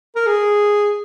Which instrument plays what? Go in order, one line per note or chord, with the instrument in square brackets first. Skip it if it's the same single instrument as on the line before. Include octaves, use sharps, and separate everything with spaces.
[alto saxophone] A#4
G#4